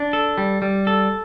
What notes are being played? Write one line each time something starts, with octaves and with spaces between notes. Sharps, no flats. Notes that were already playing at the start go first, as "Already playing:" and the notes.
Already playing: D4
A4
G3
G3
A4